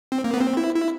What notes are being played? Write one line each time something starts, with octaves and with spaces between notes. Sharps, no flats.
C4
A#3
B3
C4
E4
E4